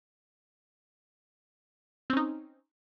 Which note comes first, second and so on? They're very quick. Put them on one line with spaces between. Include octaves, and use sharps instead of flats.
C4 C#4 D#4